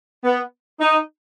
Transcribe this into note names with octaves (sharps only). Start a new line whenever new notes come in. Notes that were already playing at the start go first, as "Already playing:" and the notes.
B3
D#4